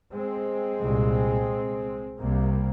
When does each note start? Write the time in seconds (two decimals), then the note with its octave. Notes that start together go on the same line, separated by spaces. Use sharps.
0.11 G#3 C4
0.81 C2 A#2
2.18 C2 C3 G3 A#3